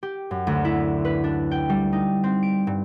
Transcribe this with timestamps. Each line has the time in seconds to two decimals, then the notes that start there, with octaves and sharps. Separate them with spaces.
0.03 G4
0.31 F#2
0.47 D2
0.65 E4
1.05 B4
1.24 D4
1.51 G5
1.69 G3
1.93 D#4
2.24 C4
2.43 D7
2.67 G2